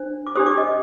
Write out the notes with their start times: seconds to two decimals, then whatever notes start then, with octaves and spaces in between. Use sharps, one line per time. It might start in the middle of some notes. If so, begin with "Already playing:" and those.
Already playing: D4 C5
0.27 D6
0.36 D4 G4 C5 D#6
0.46 D6
0.58 D#5